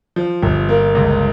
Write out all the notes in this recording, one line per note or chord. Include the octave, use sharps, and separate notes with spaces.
F3
G1
A#3
C#2